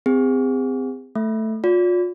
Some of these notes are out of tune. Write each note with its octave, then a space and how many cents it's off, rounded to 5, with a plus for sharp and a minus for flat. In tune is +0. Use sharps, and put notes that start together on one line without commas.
C4 -30 G#4 -40
A3 +0 E5 +0
F4 +40 D5 -40